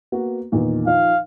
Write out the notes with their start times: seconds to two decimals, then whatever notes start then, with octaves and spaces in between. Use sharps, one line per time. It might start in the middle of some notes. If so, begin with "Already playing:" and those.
0.12 A#3 B3 F#4
0.52 E2 A#2 D#3
0.87 F3 D#4 F5